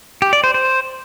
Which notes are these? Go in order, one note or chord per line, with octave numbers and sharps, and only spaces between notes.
G4
D5
C5
C5